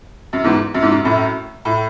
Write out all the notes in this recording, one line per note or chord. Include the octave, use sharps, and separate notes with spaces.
F#2
E2 G#2
F#2
G#2
F#2
F#2 A2
A2